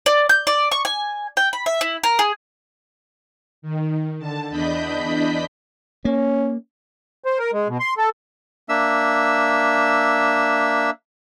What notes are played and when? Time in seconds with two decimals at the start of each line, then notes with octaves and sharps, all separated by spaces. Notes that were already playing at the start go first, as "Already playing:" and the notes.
0.06 D5
0.29 G6
0.47 D5
0.72 C#6
0.85 G#5
1.37 G5
1.53 B5
1.66 E5
1.81 E4
2.03 A#4
2.19 G#4
3.62 D#3
4.19 D3 A5
4.50 E2 D4 D#5 B5 G6 B6
6.05 A#3 C#4
7.24 C5
7.39 A#4
7.53 G#3
7.68 B2
7.80 C6
7.97 A4
8.69 A#3 D4 E5 E6